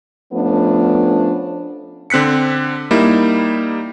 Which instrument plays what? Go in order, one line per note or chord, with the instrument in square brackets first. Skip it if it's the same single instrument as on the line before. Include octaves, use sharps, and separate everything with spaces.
[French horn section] F3 A3 B3 C#4 D4
[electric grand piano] D3 C4 F#6 B6 C#7
G3 A#3 D#4 E4